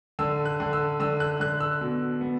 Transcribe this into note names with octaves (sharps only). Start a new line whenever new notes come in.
D3 E6
F#6
D3
E6
D3 E6
F#6
D3 F#6
E6
B2
B3